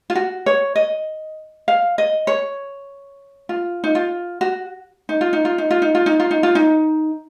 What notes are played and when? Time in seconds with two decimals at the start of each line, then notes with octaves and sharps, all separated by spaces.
0.10 F4
0.16 F#4
0.46 C#5
0.76 D#5
1.68 F5
1.98 D#5
2.27 C#5
3.49 F4
3.84 D#4
3.95 F4
4.41 F#4
5.09 D#4
5.21 F4
5.33 D#4
5.45 F4
5.58 D#4
5.71 F4
5.82 D#4
5.95 F4
6.06 D#4
6.20 F4
6.31 D#4
6.43 F4
6.55 D#4